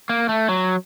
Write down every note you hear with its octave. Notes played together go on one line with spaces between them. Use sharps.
A#3
A3
F#3